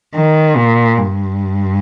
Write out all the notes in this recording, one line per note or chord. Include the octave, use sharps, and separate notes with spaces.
D#3
A#2
G2